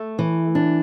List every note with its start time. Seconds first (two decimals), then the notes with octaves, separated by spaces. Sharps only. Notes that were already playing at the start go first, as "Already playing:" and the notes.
Already playing: A3
0.19 E3
0.55 D4